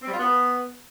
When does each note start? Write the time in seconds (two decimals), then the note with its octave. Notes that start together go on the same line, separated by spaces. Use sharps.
0.02 C4
0.08 G3
0.14 F4
0.20 B3